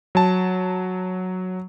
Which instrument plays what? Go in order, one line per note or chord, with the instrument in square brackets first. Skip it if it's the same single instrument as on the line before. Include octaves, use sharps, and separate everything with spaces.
[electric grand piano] F#3 A5